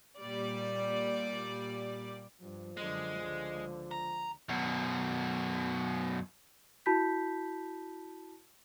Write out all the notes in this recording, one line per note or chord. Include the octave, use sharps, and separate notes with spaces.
A#2 G3 D5
G2 F3
F#2 D3 G#3
C#2 D3
A#5
F#2 B2
E4 F#4 A5 B5 G6 B6